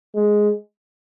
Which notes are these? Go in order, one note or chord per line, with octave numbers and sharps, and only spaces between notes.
G#3